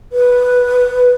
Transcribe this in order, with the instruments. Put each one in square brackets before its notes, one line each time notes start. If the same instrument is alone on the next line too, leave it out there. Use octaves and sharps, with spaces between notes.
[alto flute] B4